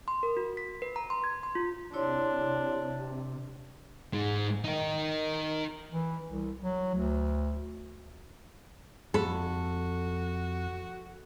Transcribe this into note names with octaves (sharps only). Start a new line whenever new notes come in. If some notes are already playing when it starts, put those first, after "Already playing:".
C6
A#4
F#4
B6
B4
A#5
C6
G#6
C6
F4
C3 D4 E4 C#5 C6
G#2 G#3
D#4 A#4
E3
C2
F#3
D2
F2 F#4 A4 B5